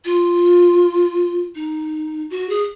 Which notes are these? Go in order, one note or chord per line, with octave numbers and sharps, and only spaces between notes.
F4
D#4
F#4
G#4